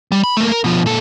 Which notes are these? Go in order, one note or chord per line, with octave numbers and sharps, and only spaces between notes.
G3
B5
A3 A#3
A#4
B2 F3
A#2 A4